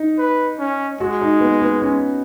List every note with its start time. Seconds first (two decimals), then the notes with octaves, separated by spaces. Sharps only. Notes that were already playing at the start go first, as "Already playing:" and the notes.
Already playing: D#4
0.19 B4
0.59 C#4
1.01 G#3 F#4
1.21 D#4
1.41 B3
1.62 B3
1.82 C#4